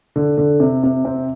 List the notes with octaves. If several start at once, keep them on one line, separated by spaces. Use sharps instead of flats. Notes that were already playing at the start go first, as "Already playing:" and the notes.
D3
D3
C3
C3
C4